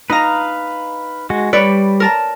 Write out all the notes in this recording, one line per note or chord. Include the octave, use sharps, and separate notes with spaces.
D#4 B4 F5 A#5
G#3 F#4
G3 B4 C#5 D5
A#4 A5 A#5